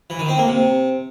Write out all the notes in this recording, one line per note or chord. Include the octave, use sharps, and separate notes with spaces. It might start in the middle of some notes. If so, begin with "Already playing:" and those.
E3
D#3
C4
A#3
C3